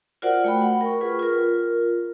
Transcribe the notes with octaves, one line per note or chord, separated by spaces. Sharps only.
F4 F#4 A#4 C5 D5 F#5
A3 G5 B5
F#5
A#4 C#6
F4 G#4 B4
F4 A#4